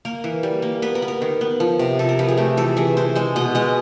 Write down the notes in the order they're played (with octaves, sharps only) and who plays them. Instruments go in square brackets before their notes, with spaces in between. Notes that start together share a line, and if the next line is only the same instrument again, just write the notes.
[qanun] A#3 A#4
E3
G3
A#3
B3 B4
A#4
B3
A#4
D#3
B3
F3
C3
C3 A4
A#4
F3 B4
G#4
A3 G4
E3 A4
E3 G#4
E3 C5
G#3 C5
B2 D#5
G#3 D#5